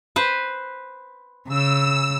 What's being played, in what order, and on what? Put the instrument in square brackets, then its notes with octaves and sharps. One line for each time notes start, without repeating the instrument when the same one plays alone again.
[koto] B4 C5
[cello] C#3 [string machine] E6